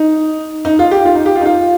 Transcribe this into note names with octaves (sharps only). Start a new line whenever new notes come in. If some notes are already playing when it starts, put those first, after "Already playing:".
Already playing: D#4
D#4
F4
G4
F4
D#4
G4
F4
D#4
F4